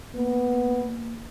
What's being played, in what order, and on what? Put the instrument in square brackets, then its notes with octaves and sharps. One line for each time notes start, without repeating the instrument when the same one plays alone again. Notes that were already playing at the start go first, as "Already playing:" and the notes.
[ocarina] A#3 [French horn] B3